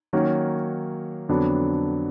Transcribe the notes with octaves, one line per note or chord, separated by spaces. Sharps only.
D#3 F#3 A#3 C#4 F#4
F2 D3 F#3 B3 D4